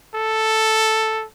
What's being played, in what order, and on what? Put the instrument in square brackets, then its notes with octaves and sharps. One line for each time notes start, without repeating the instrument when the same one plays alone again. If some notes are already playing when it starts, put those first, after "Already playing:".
[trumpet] A4